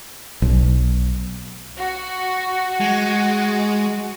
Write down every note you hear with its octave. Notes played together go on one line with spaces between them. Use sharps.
B1
F#4
G#3